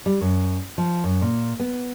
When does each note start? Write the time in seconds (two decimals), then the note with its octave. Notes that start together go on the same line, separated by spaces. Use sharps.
0.06 G3
0.21 F#2
0.78 F3
1.04 F#2
1.22 A#2
1.60 B3